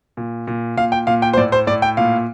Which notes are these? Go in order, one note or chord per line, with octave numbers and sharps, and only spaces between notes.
A#2
A#2
A#2 F5
G5
A#2 F5
G5
C5
A2 D5
C5
A2 D5
G5
A#2 F5